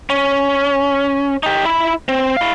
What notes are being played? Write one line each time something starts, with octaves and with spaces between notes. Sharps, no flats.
C#4
D#4 G4
E4 B5
C4
E4 F5